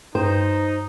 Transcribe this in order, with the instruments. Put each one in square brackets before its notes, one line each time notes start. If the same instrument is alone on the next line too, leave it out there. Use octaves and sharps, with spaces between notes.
[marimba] G2 [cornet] D#4 [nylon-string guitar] C5